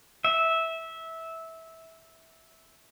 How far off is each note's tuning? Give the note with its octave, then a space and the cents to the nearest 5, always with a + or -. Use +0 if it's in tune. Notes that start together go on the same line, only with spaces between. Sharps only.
E5 -15